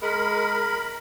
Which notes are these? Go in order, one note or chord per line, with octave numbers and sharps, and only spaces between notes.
G#3 A#4 B5